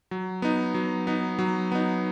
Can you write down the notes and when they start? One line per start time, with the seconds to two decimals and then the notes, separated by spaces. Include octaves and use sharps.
0.11 F#3
0.42 B3 D#4
0.74 F#3
1.07 B3 D#4
1.39 F#3
1.72 B3 D#4